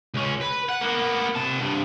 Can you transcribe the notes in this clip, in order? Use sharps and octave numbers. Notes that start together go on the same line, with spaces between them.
C#2 C#4
B4
F#5
A#3 B3
C3 A5
G2 C3